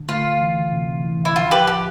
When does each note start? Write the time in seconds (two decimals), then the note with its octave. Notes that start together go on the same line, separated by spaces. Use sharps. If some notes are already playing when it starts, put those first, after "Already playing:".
Already playing: D3
0.09 A3 F4
0.24 D2
0.40 E3
0.56 D2
0.72 C3
0.88 C3
1.04 E3
1.20 D2
1.25 E4
1.36 F3 F4
1.51 F3 G4 B4
1.67 F3 G4